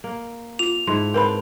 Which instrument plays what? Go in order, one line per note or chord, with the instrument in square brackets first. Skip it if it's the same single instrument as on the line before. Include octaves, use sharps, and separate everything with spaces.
[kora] A#3
[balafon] F4 [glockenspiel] F7
[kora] G#2 E4 A4 [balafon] C6
[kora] C4 D4 [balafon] A#4 B4 B5